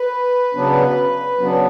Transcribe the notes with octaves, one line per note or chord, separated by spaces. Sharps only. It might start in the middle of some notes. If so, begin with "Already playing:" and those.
Already playing: B4
C#3 F#3 B3 D4
C#3 F#3 B3 D4